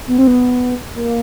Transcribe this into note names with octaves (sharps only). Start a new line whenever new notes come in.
B3
C4
B3
A#3